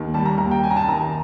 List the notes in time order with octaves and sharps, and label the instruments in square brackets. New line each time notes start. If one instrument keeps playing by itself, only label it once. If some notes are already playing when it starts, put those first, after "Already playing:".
Already playing: [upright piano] D#2 D#3
G3 A5
A#5
D#2 A#5
G5
F#2 G#5
A#5
A5
D#3 A#5
A#5